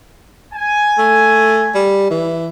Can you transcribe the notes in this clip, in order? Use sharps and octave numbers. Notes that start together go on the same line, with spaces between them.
G#5
A3
G3
E3